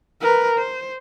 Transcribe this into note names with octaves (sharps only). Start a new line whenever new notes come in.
A#4 B4
C5